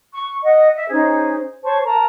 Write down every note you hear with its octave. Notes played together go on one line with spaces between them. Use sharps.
C#6
D#5 F#5
E5
C#4 D#4 G#4 C5
C5 C#5 A5 C#6
A#4 A5 A#5